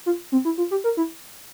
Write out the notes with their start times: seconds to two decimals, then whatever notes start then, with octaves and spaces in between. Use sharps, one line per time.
0.06 F4
0.32 C4
0.45 E4
0.58 F4
0.71 G4
0.84 A#4
0.97 E4